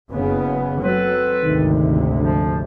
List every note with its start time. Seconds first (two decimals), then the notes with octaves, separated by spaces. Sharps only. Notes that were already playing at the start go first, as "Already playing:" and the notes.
0.10 F#1 C#3 B3
0.81 F#3 C4 A4 B4
1.44 G#1 D2 C3 D#3
2.18 D3 F3